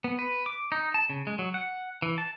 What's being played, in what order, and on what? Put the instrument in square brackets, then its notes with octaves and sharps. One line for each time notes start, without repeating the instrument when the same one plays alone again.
[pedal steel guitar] B3
B4
D6
D#4
A5
C#3
G#3
F#3
F#5
E3
A5